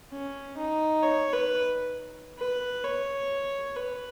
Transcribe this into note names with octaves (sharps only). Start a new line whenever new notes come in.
C#4
D#4
C#5
B4
B4
C#5
B4